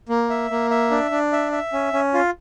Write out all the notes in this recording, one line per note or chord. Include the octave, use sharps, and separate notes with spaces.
A#3
E5
A#3
E5
D4
D4
E5
E5
C#4
C#4
F4